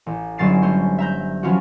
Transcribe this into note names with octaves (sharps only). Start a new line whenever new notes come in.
A1
G1 F#3 C#4 A6 C7 E7
A3 C#4 C5
E5 A#5 G6
F3 F#3 B3 C#4 F4 F#4